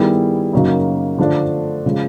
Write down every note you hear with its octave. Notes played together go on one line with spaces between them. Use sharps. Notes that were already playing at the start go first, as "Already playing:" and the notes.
Already playing: D#3 G3 B3 E4 G#4
F#2 C#3 F#3 A#3 D#4
D3 F3 A3 D4
C#3 F3 G#3